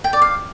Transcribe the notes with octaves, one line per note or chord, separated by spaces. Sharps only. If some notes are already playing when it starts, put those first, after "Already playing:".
G5
D5
F5